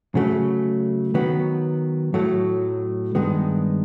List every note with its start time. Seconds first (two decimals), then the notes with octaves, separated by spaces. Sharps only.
0.15 C#3 F#3 A3
1.14 D#3 F#3 B3
2.14 A2 F#3 A3
3.15 G2 D#3 G#3 B3